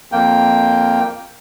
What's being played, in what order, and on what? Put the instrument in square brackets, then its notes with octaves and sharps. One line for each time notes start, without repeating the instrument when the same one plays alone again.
[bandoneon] F2 A#3 G5